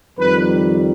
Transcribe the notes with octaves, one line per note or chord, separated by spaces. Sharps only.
F2 D#3 G3 B4